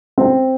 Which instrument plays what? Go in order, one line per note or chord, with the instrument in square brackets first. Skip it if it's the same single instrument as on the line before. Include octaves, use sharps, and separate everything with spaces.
[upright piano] C4